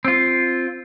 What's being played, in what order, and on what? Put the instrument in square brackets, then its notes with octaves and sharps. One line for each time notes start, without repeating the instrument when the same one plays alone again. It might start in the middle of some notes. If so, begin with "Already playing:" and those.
[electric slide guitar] C4 F4